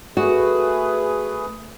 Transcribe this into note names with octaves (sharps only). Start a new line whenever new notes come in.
A3 F#4 G#4 B4